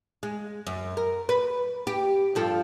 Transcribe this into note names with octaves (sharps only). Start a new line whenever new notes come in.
G#3
F#2
A#4
B4
G4
G2 F3 A4